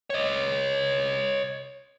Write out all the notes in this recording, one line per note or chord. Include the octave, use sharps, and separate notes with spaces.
C#5 D#5